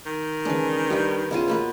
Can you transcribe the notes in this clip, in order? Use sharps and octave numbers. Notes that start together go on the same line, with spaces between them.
D#3
C#3 E3 G#3 D4 B4
G3 D4 G4 B4 D#5
C#3 B3 F4 D#5 D#7
B2 A#3 B4